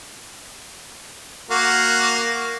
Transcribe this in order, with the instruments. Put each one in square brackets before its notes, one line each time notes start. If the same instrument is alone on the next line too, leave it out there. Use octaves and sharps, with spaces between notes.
[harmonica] A#3 F#4